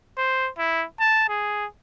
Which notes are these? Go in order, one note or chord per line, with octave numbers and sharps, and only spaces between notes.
C5
E4
A5
G#4